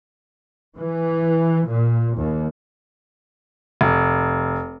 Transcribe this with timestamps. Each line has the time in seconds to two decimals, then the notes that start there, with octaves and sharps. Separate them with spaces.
0.79 E3
1.69 A#2
2.18 D#2
3.81 F1